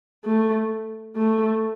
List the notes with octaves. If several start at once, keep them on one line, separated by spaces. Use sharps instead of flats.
A3
A3